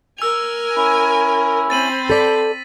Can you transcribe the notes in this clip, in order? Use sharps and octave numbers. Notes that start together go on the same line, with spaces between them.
A#4 G#5 E6 F7
C#4 E4
C4 B5 A6 D#7 F#7
A4 D5 A6 B6